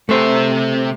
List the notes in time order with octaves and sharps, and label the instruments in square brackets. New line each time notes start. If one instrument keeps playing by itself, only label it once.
[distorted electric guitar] C3 E5 [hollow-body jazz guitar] A3 C5